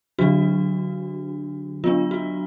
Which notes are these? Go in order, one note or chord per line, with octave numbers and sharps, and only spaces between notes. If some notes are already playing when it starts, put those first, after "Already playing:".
D3 F#3 D4 F#4
F#3 B3 D4 F4
F#4